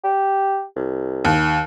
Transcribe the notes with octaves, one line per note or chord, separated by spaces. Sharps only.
G4
C2
D#2